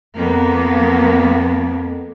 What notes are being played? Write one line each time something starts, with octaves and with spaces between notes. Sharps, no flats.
F2 F3 A#3 B3